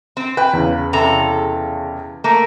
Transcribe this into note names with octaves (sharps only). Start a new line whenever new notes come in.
C4
B4 G5
E2 C#3
C3 A4 A#5
A3 A#3